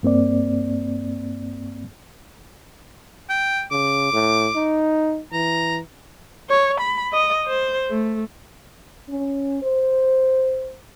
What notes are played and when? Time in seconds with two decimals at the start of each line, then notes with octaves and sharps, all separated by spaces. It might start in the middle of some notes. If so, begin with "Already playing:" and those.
0.03 G2 A#3 C4 D5
3.30 G5
3.71 C#3 D6
4.13 A2
4.55 D#4
5.32 E3 A#5
6.50 C#5
6.80 B5
7.13 D#5
7.46 C5
7.90 A3
9.09 C#4
9.63 C5